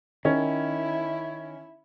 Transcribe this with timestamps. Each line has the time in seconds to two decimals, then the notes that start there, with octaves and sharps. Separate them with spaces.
0.25 D#3 C#4 E4